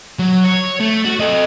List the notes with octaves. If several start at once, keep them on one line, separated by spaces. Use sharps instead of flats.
F#3
C#5
A3
F#4
A4 D#5